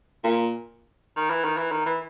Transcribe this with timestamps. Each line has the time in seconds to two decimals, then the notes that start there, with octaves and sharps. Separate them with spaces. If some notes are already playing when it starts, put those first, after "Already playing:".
0.24 A#2
1.16 D#3
1.30 E3
1.44 D#3
1.57 E3
1.71 D#3
1.86 E3